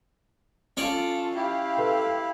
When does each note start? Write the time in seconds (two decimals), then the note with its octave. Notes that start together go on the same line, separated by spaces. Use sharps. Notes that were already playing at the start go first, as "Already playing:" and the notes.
0.77 C#4 F4 A4 D5
1.36 E4 G4 F5
1.77 A4 B4 C6